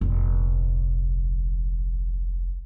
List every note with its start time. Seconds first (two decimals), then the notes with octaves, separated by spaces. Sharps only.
0.01 F1 A#1